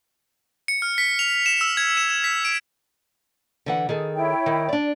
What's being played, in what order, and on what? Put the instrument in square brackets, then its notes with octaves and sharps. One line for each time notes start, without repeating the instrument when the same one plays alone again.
[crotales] C#7
F6
B6
F7
E7
E6
G#6
E7
E7
B6
D7
[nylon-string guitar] D3 E3 F#5
D#3 G#4 A4
[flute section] E4 C#5 G5
[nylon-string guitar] D#3
D4 D5